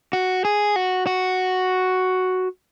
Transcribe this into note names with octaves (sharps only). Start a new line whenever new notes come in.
F#4
G#4
F#4
F#4